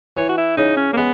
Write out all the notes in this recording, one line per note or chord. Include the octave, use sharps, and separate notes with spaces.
E3 C#5
F#4
E4
C#3 D#4
C#4
A#3
G#3 B3